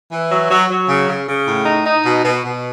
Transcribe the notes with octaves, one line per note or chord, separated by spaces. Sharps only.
E3
F#3
F#3
F#3
C#3
C#3
C#3
A2
D#4
D#4
B2
B2
B2